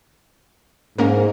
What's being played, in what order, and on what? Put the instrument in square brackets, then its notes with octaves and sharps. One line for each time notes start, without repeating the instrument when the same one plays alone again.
[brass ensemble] G#2 [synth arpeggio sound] A#3 C#4 A#4